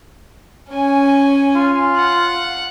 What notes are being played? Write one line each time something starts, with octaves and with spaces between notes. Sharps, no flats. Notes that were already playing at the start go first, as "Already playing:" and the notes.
C#4 G#5
F4
F#5